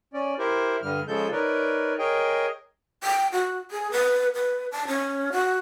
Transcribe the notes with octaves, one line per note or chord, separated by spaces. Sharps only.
C#4 D5
E4 G4 A#4 C5
G2 D3 G3 F6
C#3 F3 G#3 A4 G6
D#4 A#4 B4 C#5 D5
G#4 A#4 C#5 D#5 G5
G5
F#4
G#4
B4
B4
A5
C#4
F#4